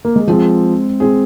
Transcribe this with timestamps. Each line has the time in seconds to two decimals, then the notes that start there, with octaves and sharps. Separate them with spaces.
0.05 A#3
0.16 G#3
0.27 F3 G#3 C4 G#4
1.00 G#3 C4 G#4